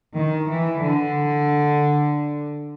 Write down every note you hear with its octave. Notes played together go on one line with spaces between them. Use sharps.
D#3
E3
D3